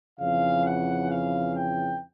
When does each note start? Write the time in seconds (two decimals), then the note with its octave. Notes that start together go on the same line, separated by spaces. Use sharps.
0.19 F2 C#3 E3 F5
0.65 F#5
1.09 F5
1.55 G5